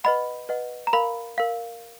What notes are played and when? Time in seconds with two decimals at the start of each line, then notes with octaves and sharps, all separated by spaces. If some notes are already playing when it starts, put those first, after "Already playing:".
0.04 B4 D#5 F#5 B5
0.49 B4 D#5 F#5
0.87 A#5
0.93 A#4 F5 B5
1.38 A#4 F5